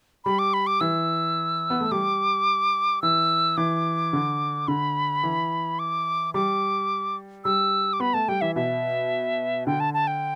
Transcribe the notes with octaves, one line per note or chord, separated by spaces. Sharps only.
G3 B5
D6
B5
D6
E3 E6
B3
A3
G3 D6
E3 E6
E3 D6
D3
D3 B5
E3
D6
G3 D6
G3 E6
D6
B3 B5
A3 A5
G3 G5
E3 E5
B2 E5
D3 G5
A5
A5
G5